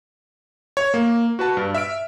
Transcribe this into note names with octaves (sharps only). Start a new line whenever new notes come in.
C#5
A#3
F#4 B4 A5
G2
E5 F6 D7